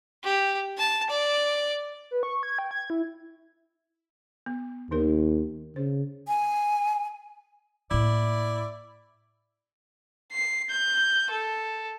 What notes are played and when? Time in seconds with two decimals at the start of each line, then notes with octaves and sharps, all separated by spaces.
0.24 G4
0.77 A5
1.10 D5
2.11 B4
2.23 C#6
2.43 G#6
2.59 G5
2.71 G#6
2.90 E4
4.46 B3
4.91 D#2 D#3 D#4 A#4
5.76 C#3 C5
6.28 G#5
7.91 A2 A#3 E4 D5
10.32 C7
10.70 G6
11.31 A4